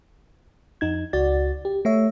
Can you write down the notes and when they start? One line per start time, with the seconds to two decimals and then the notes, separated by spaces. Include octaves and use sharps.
0.81 F2 D#4 G#6
1.13 C#2 F#4 D5 A6
1.65 G4
1.85 A3 C#5 E5